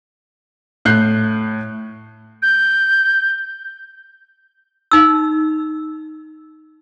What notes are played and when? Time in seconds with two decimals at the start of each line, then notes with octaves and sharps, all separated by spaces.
0.85 A2 F#6 G6 C7
2.42 G6
4.91 D#4 E6